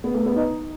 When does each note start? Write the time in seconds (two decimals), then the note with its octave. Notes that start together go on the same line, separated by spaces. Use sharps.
0.04 B3
0.14 A3
0.26 B3
0.36 D#4